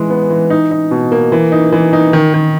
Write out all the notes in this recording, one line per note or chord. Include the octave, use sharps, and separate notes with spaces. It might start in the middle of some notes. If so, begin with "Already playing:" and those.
Already playing: E3 G#3
B3
E3
D#4
D#4
B2
A#3
E3
D#4
E3
D#4
D#3
D#3